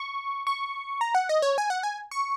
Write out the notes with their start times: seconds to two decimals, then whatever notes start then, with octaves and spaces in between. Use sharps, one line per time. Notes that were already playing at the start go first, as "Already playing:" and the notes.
Already playing: C#6
0.47 C#6
1.01 A#5
1.15 F#5
1.29 D#5
1.42 C#5
1.58 G#5
1.70 F#5
1.83 G#5
2.11 C#6